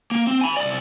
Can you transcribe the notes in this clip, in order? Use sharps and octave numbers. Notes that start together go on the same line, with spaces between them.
A#3
C4
G#5 B5
C2 D5